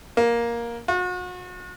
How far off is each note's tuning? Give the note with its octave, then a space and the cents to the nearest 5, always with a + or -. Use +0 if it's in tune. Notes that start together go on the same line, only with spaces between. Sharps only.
A#3 +10
F#4 -40